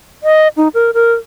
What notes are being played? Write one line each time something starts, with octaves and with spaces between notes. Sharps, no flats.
D#5
D#4
A#4
A#4